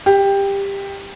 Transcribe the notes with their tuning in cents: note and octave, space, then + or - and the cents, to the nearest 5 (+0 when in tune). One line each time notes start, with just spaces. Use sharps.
G4 +15